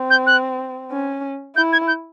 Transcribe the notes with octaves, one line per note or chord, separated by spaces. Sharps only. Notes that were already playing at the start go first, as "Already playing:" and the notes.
Already playing: C4
G6
F#6
C#4
E4 G6
G#6
G6